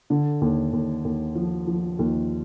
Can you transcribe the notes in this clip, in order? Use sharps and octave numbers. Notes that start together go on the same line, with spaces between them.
D3
D#2
D#2
D#2
F3
F3
D#2